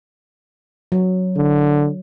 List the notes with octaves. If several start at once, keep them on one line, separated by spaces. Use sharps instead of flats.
F#3
D3